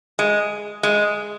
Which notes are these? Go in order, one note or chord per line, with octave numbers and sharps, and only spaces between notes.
G#3
G#3